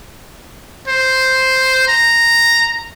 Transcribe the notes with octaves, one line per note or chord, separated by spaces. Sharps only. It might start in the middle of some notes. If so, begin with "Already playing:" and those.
C5
A#5